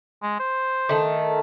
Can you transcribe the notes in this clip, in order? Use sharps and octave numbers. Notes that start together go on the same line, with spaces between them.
G#3
C5
D#3 A3